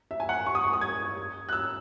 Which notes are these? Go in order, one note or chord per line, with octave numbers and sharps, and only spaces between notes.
E5
G#5
F#5
C#6
D#6
C#6
D#6
G#6
F#6
E6